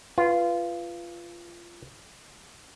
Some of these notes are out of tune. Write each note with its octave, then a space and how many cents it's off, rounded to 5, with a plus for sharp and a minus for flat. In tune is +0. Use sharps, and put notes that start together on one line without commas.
F4 -20 B4 +0